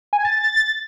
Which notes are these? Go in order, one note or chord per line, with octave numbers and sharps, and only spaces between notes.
G#5
A6
A6